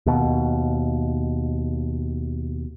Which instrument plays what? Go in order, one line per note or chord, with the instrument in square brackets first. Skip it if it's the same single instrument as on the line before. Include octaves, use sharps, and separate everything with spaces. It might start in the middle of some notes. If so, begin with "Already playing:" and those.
[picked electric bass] D#2 B2